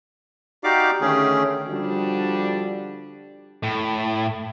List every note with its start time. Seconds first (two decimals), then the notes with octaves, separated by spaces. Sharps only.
0.64 D#4 F#4 G4 D5 F5 D6
1.01 D3 D#3 A3 C#4 G#4
1.68 D3 F3 G3 D4 F#4
3.63 A2